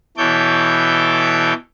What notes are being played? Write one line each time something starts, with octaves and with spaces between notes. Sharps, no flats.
B2 E3 A4 C#5 D6 G6